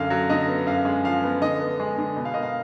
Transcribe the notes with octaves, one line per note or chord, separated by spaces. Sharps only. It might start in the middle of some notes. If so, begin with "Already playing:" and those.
Already playing: F#2 D3 F5
F#3
D3 D#5
B3
F#2 F5
G#3
F3 F5
B3
D3 D#5
B3
G#3
D3
B2
F5
A#3 D#5
F5